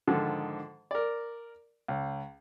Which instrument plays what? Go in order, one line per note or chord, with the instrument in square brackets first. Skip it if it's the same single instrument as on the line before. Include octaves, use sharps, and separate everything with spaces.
[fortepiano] G#2 D3 D#3 F3
A#4 D5
C#2